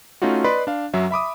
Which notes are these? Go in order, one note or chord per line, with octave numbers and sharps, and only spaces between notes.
A3 C#4 D#4 F4 F#4
B4 D5 D#5 B5 C6
D4 F5
F#2 F#3 E5
E5 B5 D6 D#6